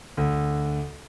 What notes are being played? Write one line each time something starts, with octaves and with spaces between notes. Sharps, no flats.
D2